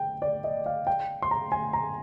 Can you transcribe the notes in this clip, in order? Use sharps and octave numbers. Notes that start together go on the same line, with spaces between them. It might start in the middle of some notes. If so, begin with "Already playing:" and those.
Already playing: G5
D5
D#5
F5
G5
C6
A#5
G#5
A#5